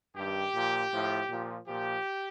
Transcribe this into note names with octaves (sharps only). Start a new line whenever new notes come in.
G2 D#3 G4
A#2 F3
A2 F3
A#2 F3
A#2 F3 G4